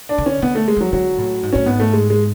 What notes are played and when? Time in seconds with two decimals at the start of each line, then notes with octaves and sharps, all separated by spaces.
0.09 D4
0.18 D3
0.26 C#4
0.42 D3 B3
0.55 A3
0.68 G#3
0.76 F3 F#3
0.93 D3 F#3
1.18 A2
1.43 G#2
1.53 A2 C#4
1.66 G#2 B3
1.80 A3
1.93 G#3
2.10 G#3